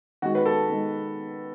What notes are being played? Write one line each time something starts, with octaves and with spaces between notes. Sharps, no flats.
D#3 G#3 F#4
B4
A4
D#3 G#3